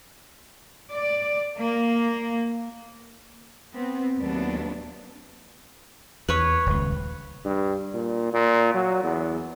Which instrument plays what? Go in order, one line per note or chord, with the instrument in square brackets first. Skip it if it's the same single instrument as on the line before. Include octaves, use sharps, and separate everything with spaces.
[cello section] D5
A#3
B3 C4
D#2 A#2 F#3 A3 B3 D4
[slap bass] E2 [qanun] B4 C#5
[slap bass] D#1 C#2
[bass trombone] G2
A#2
A#2
F#3
E2